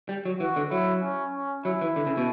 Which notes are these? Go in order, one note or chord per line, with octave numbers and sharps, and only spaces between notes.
G3
F#3
E3 F#4
D3
F#3 E4
C#4
C#4
F#3 E4
E3
D3
C#3
B2